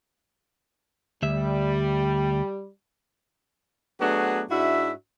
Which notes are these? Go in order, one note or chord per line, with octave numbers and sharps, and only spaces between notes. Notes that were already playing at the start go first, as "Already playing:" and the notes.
D2 G3 E5
F#3 A3 B3 D4 F#4 G#4
G#2 D4 E4 F#4 E5